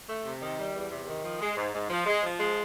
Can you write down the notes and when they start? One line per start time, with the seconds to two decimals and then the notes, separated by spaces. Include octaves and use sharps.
0.09 A3
0.25 C3
0.42 D#3
0.58 G3
0.75 E2
0.91 C3
1.08 D#3
1.24 F3
1.41 G#3
1.57 G#2
1.73 G#2
1.90 F3
2.06 G#3
2.23 F3
2.40 G#3